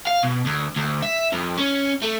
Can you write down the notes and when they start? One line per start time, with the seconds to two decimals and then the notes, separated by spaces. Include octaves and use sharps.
0.07 F5
0.23 B2
0.46 D2
0.76 D2
1.03 E5
1.32 F2
1.58 C#4
2.02 A3